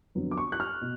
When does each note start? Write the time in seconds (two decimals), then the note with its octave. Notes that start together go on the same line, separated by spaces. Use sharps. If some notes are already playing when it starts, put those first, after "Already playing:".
0.15 F2 D3 F#3 B3
0.31 D6
0.37 C#6
0.52 F#6
0.60 F6
0.81 B2